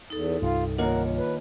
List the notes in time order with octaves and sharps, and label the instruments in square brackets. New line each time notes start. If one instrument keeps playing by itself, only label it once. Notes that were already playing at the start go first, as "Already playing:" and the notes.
[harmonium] E2 [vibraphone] D#4 A4
[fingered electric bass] C2 G2 [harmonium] F4
[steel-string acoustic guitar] D#2 [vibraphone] D4 F4 C#5 [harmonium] A#4 F#5
[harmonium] B4